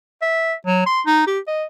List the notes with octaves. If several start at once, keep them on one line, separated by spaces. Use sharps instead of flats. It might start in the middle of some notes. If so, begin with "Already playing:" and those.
E5
F#3
C6
D#4
G4
D#5